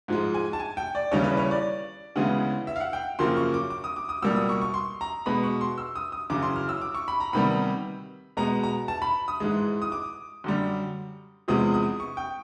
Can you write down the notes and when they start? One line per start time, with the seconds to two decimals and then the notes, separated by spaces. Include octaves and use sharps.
0.08 G#2 F3 G#3
0.34 G#5
0.53 A5
0.60 G#5
0.77 G5
0.95 D5
1.11 D#2 C#3 E3 G3 C#5
1.24 B4
1.37 C#5
1.51 D5
2.16 D2 C#3 E3 G#3 B3
2.67 E5
2.76 F5
2.80 F#5
2.93 G5
3.19 F#2 C#3 F3 A#3 C6
3.37 C#6
3.54 D6
3.70 D6
3.84 D#6
3.96 D6
4.09 D#6
4.22 C#2 B2 G3 A#3 E6
4.36 D#6
4.49 C#6
4.62 C#6
4.74 C6
5.01 A#5
5.26 B2 G#3 B3 B5
5.43 C#6
5.61 C6
5.78 E6
5.96 D#6
6.12 D#6
6.30 F#2 C#3 E3 D6
6.43 C6
6.56 F6
6.69 E6
6.81 D6
6.94 C#6
7.08 B5
7.20 A#5
7.33 D2 C3 D#3 G3 B3 B5
8.37 B2 G#3 B3 A#5
8.63 A#5
8.88 A5
9.02 B5
9.28 D#6
9.40 G#2 E3 G#3
9.82 D#6
9.92 D6
10.44 F#2 D3 G3
11.48 E2 C3 F3 G#3 B3 D#6
11.74 D#6
12.00 C#6
12.17 G5